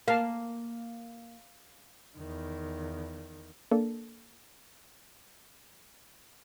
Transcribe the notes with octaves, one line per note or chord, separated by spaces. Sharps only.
A#3 F5 A5
E2 D#3
A#3 D4 A4